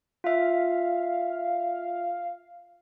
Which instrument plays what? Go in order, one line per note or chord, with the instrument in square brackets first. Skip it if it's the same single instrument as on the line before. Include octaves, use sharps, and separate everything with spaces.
[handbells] F4 E5 [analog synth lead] F5